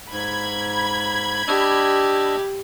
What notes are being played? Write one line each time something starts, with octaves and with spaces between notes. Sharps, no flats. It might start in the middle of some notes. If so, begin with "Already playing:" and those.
G#2 B5 G#6
D4 G4 D#5 E6